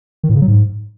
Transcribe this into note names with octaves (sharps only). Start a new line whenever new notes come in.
D#3
A2
C#3
F#3
G#2